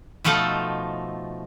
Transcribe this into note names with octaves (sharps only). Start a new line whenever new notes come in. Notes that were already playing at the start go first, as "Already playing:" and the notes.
B2 F3 A3 D#4 F4 A4